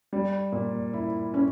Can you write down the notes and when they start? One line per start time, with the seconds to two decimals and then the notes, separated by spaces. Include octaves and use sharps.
0.13 G3
0.52 A#2
0.93 E4
1.34 C#4